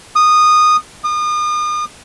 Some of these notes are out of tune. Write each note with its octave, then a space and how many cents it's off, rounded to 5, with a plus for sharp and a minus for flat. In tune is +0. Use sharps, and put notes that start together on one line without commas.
D#6 -15
D#6 -40